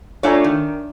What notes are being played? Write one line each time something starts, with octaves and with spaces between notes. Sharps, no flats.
A3 D4 F4 C#5 G#5 A#5
D#3